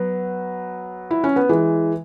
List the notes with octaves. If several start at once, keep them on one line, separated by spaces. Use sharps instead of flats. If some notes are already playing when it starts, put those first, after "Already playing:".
Already playing: F#3 B3
E4
C#4
B3
E3 G#3